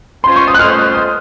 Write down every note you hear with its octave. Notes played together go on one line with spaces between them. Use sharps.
C#4 F4 C5 C6
C#6
D#6
F#6
A3 C#4 F4 C5 F6
D#6